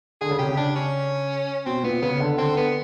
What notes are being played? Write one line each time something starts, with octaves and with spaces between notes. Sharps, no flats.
D3 G#4
C#3
C3 G4
C#3
D4
C#4
B2 C4
A#2 B3
C#3 B3
D3
D3 C4
B3